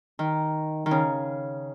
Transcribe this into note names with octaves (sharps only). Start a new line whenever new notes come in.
D#3
D#3
C#3